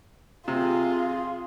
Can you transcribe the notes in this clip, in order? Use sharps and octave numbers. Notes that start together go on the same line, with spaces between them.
C3 F4 G#4